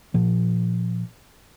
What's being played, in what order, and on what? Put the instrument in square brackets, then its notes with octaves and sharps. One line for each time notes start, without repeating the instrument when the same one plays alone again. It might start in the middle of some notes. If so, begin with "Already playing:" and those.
[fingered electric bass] A#2 F3